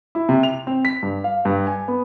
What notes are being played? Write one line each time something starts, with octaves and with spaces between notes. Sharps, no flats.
E4
C3
F7
C4
B6
G2
F5
G2
G#5
B3